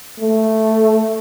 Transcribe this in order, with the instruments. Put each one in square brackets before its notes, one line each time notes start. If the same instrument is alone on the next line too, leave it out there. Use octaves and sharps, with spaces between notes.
[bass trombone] A3